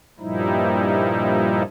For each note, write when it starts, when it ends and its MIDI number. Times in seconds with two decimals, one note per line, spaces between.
0.20 1.63 43
0.20 1.63 46
0.20 1.63 53
0.20 1.63 55
0.20 1.63 63
0.20 1.63 64